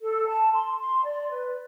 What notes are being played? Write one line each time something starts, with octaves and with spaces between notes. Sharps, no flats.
A4
A5
C6
C6
D5
B4